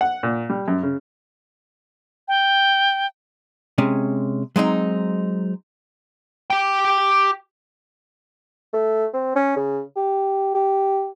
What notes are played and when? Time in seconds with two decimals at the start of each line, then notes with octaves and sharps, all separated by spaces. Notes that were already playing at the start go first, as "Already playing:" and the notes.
0.01 F#5
0.23 A#2
0.50 G3
0.68 F#2
0.83 C#3
2.28 G5
3.78 C3 G#3 C#4
4.56 F#3 G#3 C4 D#4
6.50 G4 G5
8.73 A3
9.14 C4
9.35 C#4
9.56 C#3
9.96 G4
10.55 G4